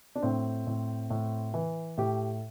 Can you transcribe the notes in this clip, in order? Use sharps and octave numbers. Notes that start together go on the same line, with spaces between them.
D4
A2 C4
A2
A2
E3
A2 G4